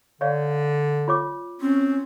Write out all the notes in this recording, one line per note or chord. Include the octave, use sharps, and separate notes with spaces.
D3 C#5 D5 F5
F4 C#5 D6
C4 C#4